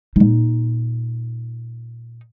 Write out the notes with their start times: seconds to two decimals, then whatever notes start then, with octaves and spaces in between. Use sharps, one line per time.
0.16 A#2 D#4